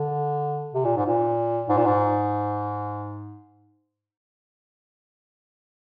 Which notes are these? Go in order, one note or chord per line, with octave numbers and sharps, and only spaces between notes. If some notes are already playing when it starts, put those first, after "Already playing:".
Already playing: D3
C3
A#2
G#2
A#2
G#2
A#2
G#2